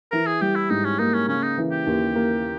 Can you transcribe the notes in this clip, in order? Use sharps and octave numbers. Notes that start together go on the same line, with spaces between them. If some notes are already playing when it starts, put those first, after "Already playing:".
E3 A#4
G#4
G3 G4
E4
G#2 D#4
C#4
A#3 D#4
C#4
C#3 C#4
D#4
E3
G4
D#2
A#3